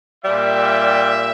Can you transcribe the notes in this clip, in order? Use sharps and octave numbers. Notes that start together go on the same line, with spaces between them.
A#2 G3 E5